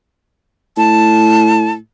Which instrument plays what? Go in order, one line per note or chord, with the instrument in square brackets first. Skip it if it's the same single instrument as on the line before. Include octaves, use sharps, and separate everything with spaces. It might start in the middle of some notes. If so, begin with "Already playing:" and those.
[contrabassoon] A2 [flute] A5